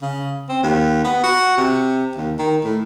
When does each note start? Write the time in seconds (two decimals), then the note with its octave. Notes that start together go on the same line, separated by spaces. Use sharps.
0.02 C#3
0.49 C4
0.63 D#2
1.04 B3
1.24 F#4
1.58 C3
2.15 D#2
2.39 D#3
2.64 A2